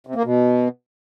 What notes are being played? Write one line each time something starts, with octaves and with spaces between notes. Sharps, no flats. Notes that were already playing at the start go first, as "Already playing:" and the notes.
C3
A#3
B2